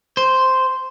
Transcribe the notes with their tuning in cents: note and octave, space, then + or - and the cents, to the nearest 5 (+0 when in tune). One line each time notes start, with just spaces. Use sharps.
C5 -5